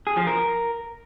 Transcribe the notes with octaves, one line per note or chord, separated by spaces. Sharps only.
G#4
F3
A#4